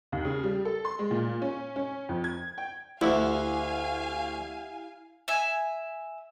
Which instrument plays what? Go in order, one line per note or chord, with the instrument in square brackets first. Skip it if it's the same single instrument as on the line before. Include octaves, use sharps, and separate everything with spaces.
[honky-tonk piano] D#2
C#3
G3
A4
C6
G#3
A#2
C#4
C#4
F2
G#6
G5
[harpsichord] D2 [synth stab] E4 [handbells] G4 F#5 E6 [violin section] F5 G#5
[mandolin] E5 G#5